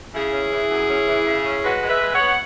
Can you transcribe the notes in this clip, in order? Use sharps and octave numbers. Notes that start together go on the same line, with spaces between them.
C#3 E4 G#4
C#4
E3
F#2
C#4
E3
C#3
C#4
G#3 F#4 B4
G#3
B4 E5
G#3
C#5 F#5
B3